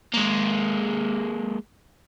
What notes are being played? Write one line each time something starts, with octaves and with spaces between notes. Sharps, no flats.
G#3 A#3